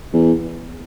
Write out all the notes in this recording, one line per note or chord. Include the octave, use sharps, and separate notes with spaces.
E2